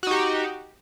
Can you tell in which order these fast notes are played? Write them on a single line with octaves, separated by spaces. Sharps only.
F#4 D#4 G4